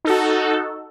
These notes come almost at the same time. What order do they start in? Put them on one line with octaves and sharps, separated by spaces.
D#4 A4 F#4